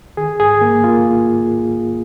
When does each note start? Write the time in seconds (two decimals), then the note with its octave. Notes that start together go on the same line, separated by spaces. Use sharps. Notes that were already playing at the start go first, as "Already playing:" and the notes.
0.17 D#3 G#4
0.40 G#2 G#4
0.61 A#3
0.84 A#3 F4